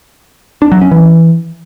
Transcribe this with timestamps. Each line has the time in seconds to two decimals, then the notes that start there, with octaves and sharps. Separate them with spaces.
0.62 D4
0.72 F#3
0.81 C#4
0.91 E3